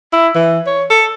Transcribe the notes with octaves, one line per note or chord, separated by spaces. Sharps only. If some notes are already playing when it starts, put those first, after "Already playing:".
E4
E3
C#5
A4